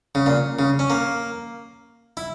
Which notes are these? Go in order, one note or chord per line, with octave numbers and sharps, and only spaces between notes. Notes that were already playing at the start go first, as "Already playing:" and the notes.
C#3
A#2
C#3
C#4
A#3
E4